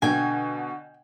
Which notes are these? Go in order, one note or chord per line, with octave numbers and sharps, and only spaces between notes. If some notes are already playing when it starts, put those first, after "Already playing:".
B2 D3 G5 G#5